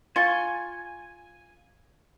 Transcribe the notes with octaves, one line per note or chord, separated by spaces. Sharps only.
F4 G#5 C#6 A6 G7